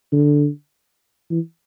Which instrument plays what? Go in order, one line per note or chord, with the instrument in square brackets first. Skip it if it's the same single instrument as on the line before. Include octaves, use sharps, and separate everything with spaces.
[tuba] D3
E3